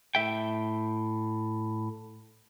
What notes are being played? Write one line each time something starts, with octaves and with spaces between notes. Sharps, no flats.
A2 E5 G5